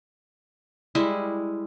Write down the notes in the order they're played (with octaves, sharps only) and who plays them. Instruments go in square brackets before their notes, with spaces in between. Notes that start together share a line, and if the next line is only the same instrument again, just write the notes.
[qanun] G3 G#3 E4